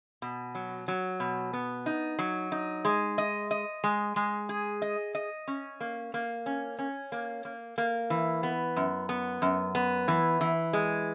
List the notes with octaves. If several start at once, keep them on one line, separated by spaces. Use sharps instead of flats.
B2
F#3
F#3
B2
B3
D#4
F#3
D#4
G#3
D#5
D#5
G#3
G#3
G#4
D#5
D#5
C#4
A#3
A#3
C#4
C#4
A#3
A#3
A#3
E3
B3
F#2
B3
F#2
B3
E3
E3
G#3